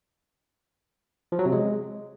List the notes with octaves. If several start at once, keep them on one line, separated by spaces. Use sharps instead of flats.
F3
F#3
C3
G#3